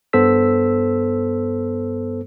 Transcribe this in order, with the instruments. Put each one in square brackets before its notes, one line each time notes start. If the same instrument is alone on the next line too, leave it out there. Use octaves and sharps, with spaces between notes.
[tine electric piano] G2 B3 A4 C5 E6 B6